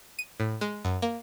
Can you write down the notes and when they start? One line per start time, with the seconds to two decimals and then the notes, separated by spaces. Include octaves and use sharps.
0.19 D#7
0.40 A2
0.61 G#3
0.85 F#2
1.02 A#3